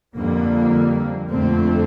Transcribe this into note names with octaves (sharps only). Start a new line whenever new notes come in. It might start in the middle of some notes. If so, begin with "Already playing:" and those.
F2 D3 G3 A#3
F2 D3 A3 C4